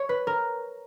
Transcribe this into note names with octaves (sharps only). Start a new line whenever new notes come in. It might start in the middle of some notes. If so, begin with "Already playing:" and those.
Already playing: C#5
B4
A#4